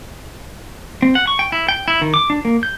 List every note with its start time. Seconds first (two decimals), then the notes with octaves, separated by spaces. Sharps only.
1.02 C4
1.15 F#5
1.27 C#6
1.39 G5
1.52 E4
1.69 G5
1.88 E4
2.01 D#3
2.14 D6
2.30 D4
2.45 A#3
2.63 G6